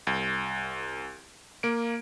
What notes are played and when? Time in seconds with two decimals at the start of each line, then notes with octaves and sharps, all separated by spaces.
0.07 C2
1.63 A#3 D7